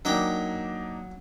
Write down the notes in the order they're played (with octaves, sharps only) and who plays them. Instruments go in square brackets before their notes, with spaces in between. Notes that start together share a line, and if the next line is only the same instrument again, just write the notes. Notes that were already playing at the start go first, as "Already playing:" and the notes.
[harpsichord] F#3 G5 D6 [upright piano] A#3 D4 D#4